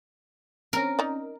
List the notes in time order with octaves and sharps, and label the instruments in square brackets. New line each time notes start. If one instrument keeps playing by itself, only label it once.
[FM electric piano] C4 C#4 [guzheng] A#4
[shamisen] D#4 D5